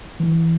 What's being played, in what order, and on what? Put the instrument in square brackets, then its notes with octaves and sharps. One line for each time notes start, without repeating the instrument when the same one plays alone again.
[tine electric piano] E3